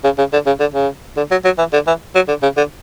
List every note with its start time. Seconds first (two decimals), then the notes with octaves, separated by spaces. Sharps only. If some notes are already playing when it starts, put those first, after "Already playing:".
0.04 C#3
0.18 C#3
0.33 D3
0.46 C#3
0.60 D3
0.74 C#3
1.17 D3
1.31 F#3
1.45 F#3
1.58 E3
1.73 D3
1.87 E3
2.15 F#3
2.28 D3
2.43 C#3
2.57 D3